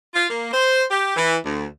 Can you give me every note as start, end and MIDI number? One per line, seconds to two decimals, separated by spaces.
0.14 0.25 65
0.29 0.48 58
0.53 0.83 72
0.90 1.15 67
1.16 1.36 52
1.44 1.65 38